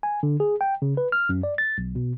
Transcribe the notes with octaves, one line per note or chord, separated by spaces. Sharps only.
G#5
D3
G#4
G5
C#3
B4
F6
F#2
D5
A6
B1
B2